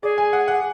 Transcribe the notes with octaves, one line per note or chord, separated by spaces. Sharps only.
G#4 D5
G#5
F#5
F#5